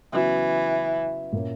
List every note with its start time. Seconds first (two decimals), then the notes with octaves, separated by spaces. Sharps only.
0.13 C#3 E3 F#3 B3 F#4
1.33 A#2 A#3 C#4